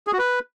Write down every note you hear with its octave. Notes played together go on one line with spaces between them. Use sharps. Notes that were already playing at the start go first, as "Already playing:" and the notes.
G#4
F#4
B4